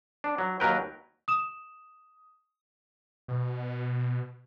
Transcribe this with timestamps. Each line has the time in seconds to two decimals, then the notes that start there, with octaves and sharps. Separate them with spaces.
0.24 D4
0.38 F#3
0.60 D#2 F#3 A#4 B4 G5
1.28 D#6 E7
3.28 B2